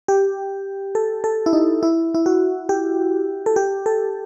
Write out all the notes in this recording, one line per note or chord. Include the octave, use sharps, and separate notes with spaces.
G4
A4
A4
E4
D#4
E4
E4
F#4
G4
A4
G4
A4